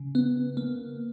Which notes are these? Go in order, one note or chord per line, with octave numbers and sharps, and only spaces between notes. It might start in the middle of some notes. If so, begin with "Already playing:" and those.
Already playing: C#3
B3
A#3